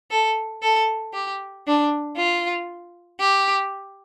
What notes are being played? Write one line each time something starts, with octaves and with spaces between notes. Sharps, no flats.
A4
A4
G4
D4
F4
G4